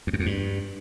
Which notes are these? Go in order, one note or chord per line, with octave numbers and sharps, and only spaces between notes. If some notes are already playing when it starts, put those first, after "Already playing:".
F2
F#2
F2
G2